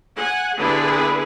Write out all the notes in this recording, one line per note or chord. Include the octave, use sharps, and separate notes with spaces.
F#5 G#5
D3 B3 E4 G4 G#4 B4